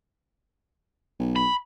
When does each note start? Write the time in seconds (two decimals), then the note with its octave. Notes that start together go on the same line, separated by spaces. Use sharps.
1.19 B1
1.36 B5